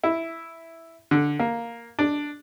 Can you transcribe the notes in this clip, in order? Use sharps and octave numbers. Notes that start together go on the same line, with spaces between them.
E4
D3
A#3
D4